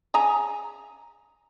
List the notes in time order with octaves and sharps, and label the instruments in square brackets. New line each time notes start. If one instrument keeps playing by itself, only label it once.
[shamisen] G#4 G#5 A#5